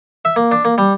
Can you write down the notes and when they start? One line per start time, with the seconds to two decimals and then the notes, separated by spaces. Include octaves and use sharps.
0.25 E5
0.36 A#3
0.51 D4
0.65 A#3
0.78 G3